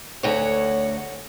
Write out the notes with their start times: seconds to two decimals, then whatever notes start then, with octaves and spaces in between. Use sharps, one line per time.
0.23 D2 F#4 C#5